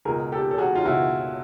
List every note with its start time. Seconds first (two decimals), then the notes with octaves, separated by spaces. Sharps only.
0.05 C#2 G#4 A#4
0.09 B2
0.32 G4 A4
0.51 A4
0.58 F#4 G#4
0.75 F4
0.85 C#2 B2 E4 F#4